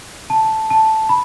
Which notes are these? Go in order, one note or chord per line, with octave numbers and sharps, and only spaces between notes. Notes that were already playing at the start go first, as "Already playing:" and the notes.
A5
A5
B5